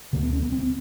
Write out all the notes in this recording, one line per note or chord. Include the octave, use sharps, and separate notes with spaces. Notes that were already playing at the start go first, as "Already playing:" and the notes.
D2 D3 A#3
B3
C#4
B3
C4